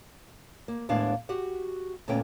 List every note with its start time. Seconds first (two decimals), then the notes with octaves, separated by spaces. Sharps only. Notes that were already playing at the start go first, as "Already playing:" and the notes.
0.68 A#3
0.89 D#2 A2 G#3 B3 D4 F5
1.29 F#4 G4 F#5
2.08 D2 A#2 A3 B3 C#4 G5